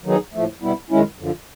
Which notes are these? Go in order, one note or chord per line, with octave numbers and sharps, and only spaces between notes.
D#3 F#3 B3 D#4 G#4
A2 F3 A3
B2 G3 B3 E4
F#2 D#3 G#3 C#4 E4
F#2 D3 F3